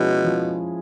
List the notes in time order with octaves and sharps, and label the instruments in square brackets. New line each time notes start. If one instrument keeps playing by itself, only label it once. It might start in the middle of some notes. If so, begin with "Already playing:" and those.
Already playing: [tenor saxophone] B2 [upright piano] F3 G#3 C#4 E4 G#4
[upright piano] F3